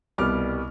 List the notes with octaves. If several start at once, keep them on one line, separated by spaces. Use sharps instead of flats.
C2 B2 G3 B3 D6 F6